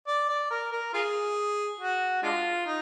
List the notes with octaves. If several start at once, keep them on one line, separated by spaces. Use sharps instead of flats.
D5
D5
A#4
A#4
F4 G#4
F#4
G#3 D4 F4
D#4